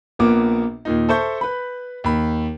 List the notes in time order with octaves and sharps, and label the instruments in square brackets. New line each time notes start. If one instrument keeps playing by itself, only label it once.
[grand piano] A#1 A#2 A#3 B3 D6
D#2 A#2 D#4
A4 C5 E5 A5 C#6 G6
B4 B5
D#2 B5